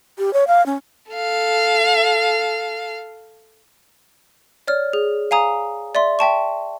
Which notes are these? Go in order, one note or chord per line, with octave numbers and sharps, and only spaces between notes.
G4
C#5
F5
C#4
A4 F5
C#5 D5 F6
G#4
F5 G#5 A#5 D#6
D5 E5 C6
E5 G5 A5 C#6